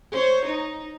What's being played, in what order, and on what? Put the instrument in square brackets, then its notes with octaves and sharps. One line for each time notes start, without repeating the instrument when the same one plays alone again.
[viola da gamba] C5 C#5
D#4